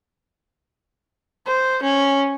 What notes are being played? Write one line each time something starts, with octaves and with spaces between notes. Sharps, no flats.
C5
C#4